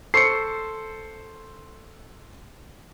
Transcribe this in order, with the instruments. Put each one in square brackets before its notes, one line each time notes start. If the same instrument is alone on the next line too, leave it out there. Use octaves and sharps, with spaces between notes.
[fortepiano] A4 C5 C#6 [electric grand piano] C7 C#7